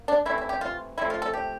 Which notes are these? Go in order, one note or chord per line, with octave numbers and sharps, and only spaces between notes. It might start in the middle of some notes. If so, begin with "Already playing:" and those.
Already playing: A#3
D4
C3 E3 A3 E4
E4
G4
F4
C3 F3 A3 E4
F4
A4
G4